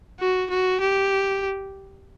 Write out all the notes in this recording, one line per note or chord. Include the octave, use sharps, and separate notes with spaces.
F#4
F#4
G4